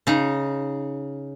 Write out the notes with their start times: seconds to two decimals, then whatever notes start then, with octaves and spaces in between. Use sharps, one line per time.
0.07 C#3 D#4